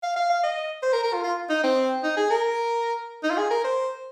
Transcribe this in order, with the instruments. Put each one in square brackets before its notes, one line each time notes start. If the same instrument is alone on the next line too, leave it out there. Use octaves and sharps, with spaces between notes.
[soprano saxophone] F5
F5
F5
D#5
C5
A#4
A#4
F4
F4
D#4
C4
D#4
G#4
A#4
D#4
F4
G#4
A#4
C5